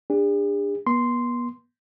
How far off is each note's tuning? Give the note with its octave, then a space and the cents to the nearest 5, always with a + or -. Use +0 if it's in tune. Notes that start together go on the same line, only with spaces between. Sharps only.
D4 +0 G#4 -45
B3 -35 C6 -5